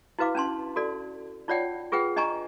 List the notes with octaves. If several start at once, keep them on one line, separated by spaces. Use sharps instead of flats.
E4 F#4 B4 F5 D6
C#4 D4 A5 C6
F#4 A4 D5
D#4 F4 C#5 D5 F#5 G5
F4 G#4 B4 F#5 G5
D4 D#5 G#5 A#5 C#6